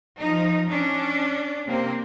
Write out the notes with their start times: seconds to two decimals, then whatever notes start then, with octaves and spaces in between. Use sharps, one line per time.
0.20 F3 D#4
0.69 C#4 D4
1.67 C3 A#3 C4